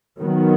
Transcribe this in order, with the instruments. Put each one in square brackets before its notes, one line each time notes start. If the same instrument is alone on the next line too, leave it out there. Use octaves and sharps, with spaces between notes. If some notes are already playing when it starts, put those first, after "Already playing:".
[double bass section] D#3 F#3 B3